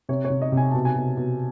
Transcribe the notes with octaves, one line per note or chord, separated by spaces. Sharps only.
C3 C#5
C#5
C3
D#5
C3
G#5
B2 A5
G#5
B2
B2